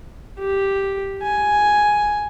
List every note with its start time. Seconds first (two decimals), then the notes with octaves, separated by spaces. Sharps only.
0.39 G4
1.23 G#5